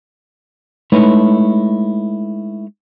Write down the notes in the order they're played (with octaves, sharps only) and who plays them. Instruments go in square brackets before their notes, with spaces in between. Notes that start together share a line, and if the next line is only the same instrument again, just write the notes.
[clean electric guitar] G#3 A3 D#4 E4 B4 C#5